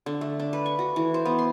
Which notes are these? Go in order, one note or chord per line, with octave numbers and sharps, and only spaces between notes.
D3
A3
D4
B4
C#6
F#4
E3
C5
B3
C6